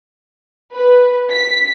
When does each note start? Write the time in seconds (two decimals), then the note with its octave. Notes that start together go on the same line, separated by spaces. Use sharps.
0.74 B4
1.30 B6